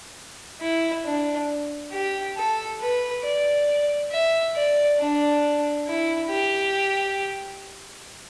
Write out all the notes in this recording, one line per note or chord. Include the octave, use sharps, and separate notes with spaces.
E4
D4
G4
A4
B4
D5
E5
D5
D4
E4
G4